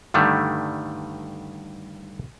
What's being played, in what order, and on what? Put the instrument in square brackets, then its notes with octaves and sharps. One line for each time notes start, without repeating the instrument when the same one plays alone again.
[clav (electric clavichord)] G2 D3 D#3 G3 A3